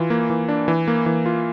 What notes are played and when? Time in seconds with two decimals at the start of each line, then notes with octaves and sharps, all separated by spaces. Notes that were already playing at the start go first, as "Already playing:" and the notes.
Already playing: E3 F4
0.10 A#3
0.30 E3
0.49 D4
0.68 E3
0.88 A#3
1.06 E3
1.26 F4